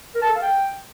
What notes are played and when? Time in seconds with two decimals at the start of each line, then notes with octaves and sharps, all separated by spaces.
0.15 A#4
0.22 A5
0.29 A4
0.36 F5
0.42 G5